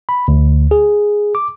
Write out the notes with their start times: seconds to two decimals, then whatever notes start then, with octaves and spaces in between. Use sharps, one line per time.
0.09 B5
0.28 D2
0.71 G#4
1.35 D6